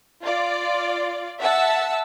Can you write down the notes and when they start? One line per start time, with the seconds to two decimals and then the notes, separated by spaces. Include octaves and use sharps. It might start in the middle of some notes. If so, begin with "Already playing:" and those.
0.22 F4 D5
1.39 E5 F#5 A5 E6